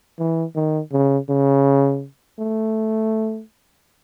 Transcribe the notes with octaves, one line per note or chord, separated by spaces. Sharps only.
E3
D#3
C#3
C#3
A3